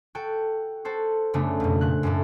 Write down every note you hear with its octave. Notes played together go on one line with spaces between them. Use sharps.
F#4 A4 G5
F#4 A4 C5
F#2 C#3 A3 B3 D4
F2 B2
A#2 F#6
F#2 A2 A3